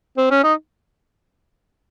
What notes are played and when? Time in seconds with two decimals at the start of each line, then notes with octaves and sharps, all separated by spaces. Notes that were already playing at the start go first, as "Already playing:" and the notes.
0.17 C4
0.31 C#4
0.44 D#4